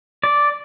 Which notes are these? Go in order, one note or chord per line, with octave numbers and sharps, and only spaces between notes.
D5